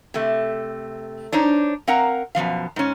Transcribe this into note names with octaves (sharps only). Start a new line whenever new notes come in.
C3 A3
D4 D#4 C5 C#5
C4 A#4 F5 F#5 A#5
F#2 B2 F3 F5
G#2 C#4